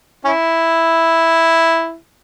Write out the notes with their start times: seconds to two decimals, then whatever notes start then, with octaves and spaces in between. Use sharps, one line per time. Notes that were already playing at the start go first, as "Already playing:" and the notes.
0.25 C#4 E4